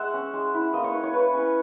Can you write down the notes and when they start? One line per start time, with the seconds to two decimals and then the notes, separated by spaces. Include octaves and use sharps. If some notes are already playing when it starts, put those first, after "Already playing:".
Already playing: G#3 E5 F#5
0.14 C#4
0.34 G#3
0.54 E4
0.73 A#3 D#5
0.84 C#5
0.94 E4
1.04 C#5
1.14 E4 B4
1.33 C#4 G#5